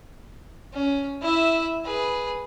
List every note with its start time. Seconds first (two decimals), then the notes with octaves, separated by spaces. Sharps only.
0.73 C#4
1.22 E4 E5
1.84 G#4 B4